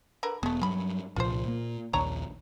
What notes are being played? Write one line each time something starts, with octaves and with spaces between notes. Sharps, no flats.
D3 A#4 B4
E1 G#3 A3 B3
G2 C#3 F#3 B5
C2 A#2 F3 F4 C5
A#2 A#3
A#1 D#2 D4 C#5 A#5